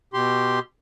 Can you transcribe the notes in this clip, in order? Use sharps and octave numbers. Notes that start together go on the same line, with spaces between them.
B2 G4 C6